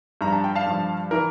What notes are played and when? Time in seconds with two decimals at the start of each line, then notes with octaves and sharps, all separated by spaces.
0.21 G2 F3 A#5
0.32 A5
0.44 G5
0.55 F5 A5
0.66 G2 F3
1.11 E3 A#4